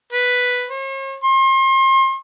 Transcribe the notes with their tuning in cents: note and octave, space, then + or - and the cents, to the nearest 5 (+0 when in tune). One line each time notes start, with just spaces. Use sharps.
B4 +0
C#5 -45
C6 +40